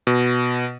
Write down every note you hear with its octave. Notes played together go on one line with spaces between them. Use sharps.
B2